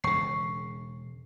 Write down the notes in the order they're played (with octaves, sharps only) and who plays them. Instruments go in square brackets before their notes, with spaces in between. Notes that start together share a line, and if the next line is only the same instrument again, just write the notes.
[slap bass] E1 C#3 [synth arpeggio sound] C#6 C7